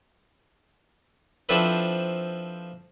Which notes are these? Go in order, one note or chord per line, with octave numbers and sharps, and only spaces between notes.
F3 C4 D4 E4 A4 B4